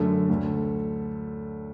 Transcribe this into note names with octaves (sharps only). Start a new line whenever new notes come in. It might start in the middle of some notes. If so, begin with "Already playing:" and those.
Already playing: F#2 D3 A3
D2 D3